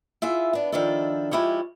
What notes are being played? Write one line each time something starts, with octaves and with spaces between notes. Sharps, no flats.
E4 F4 G#4 E5 F#5
B3 D4
D#3 F3 D4 E4 A4
F3 G#3 E4 G4 C#5